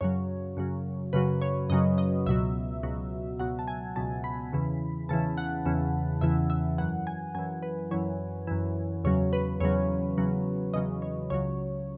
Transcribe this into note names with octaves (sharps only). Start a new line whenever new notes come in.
F#2 C#3 F#3 C#5
F#2 C#3 F#3
F#2 C#3 F#3 B4
C#5
F#2 C#3 F#3 D#5
D#5
C#2 B2 F#3 E5
C#2 B2 F#3
C#2 B2 F#3 F#5
A5
G#5
C#2 B2 F#3 A5
B5
E2 C#3 E3
E2 C#3 E3 A5
F#5
E2 C#3 E3
E2 C#3 E3 E5
E5
F#2 E3 F#5
G#5
F#2 E3 G#5
B4
F#2 E3 C#5
F#2 E3
E2 C#3 F#3 C#5
B4
E2 C#3 F#3 C#5
E2 C#3 F#3
E2 C#3 F#3 D#5
C#5
C#2 C#3 F#3 C#5